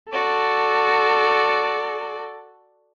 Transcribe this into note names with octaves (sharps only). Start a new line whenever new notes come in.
F#4 A4 D5